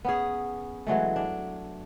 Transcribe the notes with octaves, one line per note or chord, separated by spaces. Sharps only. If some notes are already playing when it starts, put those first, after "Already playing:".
B3 C#4 G#4
E3 F#3 G#3 A3
D4